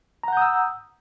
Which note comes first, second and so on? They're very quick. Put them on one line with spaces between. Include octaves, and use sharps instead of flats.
A#5 F#5 G6 D#6 E6